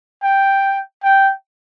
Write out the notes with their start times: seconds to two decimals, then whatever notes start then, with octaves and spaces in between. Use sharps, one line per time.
0.23 G5
1.03 G5